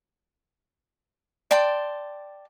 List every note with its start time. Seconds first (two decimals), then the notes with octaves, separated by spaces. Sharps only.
1.51 D5 G5 A5 C6